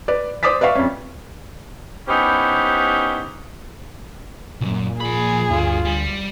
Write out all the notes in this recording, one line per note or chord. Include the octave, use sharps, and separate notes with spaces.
B4 D5
C5 D5 D6 D#6 A6 B6
B4 D5 E5 F5 C#6
F2 C#4
B3 C#4 D#4 E4 G4 C5
C2 F#2 A#2
F3 G#4 B5
D2 G2 G3 F4
G3